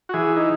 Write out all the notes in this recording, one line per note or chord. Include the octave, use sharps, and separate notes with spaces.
F#4
E3 G#4
D#4